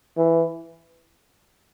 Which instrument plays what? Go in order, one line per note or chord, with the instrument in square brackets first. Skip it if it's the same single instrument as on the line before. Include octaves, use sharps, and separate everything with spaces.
[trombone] E3